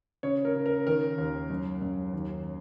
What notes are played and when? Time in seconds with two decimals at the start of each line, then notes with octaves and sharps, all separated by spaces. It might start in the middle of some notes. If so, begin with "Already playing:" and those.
0.23 C#3 C#5
0.45 A#4
0.55 C#3
0.66 A#4
0.87 D#3 A#4
1.18 D#2
1.50 F#2
1.82 F#2
2.13 D#2